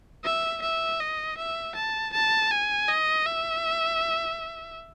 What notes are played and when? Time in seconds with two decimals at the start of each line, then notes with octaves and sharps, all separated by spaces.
0.24 E5
0.62 E5
1.00 D#5
1.38 E5
1.76 A5
2.13 A5
2.51 G#5
2.88 D#5
3.27 E5